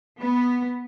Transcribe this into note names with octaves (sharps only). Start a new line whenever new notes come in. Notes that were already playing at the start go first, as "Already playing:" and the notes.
B3